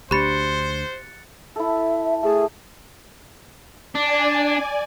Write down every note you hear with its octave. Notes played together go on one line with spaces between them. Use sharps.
D2 D4 G4 C5 B5 F#6 A6 C#7
E4 A4 E5
A3 G#4 A5
D4 D5 G#5